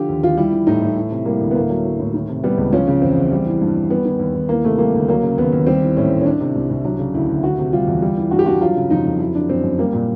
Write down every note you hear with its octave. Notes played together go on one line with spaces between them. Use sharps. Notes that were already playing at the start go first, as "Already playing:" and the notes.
Already playing: D3 F3 G4
D#2
D#2 F4
G3 E4
E3
A2 D#4
A2
E3
C3
G3 A#3
D2
B3
A2 A#3
F#3
F#3
A2
D#3
C3
G3 B3
C#2
F3 C#4
C#3
E2 C4
E2
G3
E3
G2
G2
G3 B3
D#3
D#2
D#2
E3 A#3
C3 A3
G3 A#3
D2
F#3 A#3
C#3
D#2 B3
D#2
G3 C4
E3
A2 C#4
A2
C#4
D#3 D4
C3
C2
C2
F#3 D4
C#3
D2 E4
D2
D#3 F#4
C3
G3 F4
E2
G3
E3
G2 F#4
G4
G2 F#4
F#3 F4
C#3
F2 D#4
F2
F#3 E4
D3 D4
F#2 C4
F#2
G3 A#3
A#2